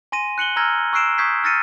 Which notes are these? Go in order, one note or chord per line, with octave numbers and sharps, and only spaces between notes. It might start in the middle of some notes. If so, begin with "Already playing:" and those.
G#5 C6 A#6 D#7
F#6 C#7 F#7 G7
A#5 E6 F6 G#6 A#6
C#6 E6 F#6 C7 D7 E7
C#6 D#6 G6 G#6 B6 C7
E6 F6 A6 A#6 C#7 D#7